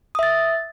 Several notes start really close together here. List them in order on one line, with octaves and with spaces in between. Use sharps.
D#6 E5 A6